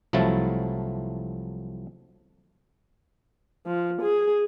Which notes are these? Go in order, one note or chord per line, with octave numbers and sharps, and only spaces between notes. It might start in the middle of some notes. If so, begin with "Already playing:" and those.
C2 F3 F#3 A3 E4 A5
F3
G#4